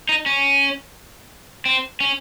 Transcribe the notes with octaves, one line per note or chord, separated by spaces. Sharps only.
D#4
C#4
C4
C#4